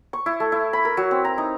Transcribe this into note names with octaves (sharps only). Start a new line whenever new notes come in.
C#6
E4
A3
E4
B5
A#4
F#3
C4
A#5
D#4